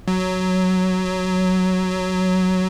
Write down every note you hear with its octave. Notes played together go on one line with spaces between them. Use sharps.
F#3